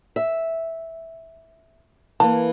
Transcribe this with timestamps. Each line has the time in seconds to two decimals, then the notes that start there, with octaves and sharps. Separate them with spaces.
0.16 E5
2.20 E3 A#3 A5